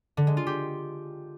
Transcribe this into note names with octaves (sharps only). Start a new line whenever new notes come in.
D3
G#3
F4
G4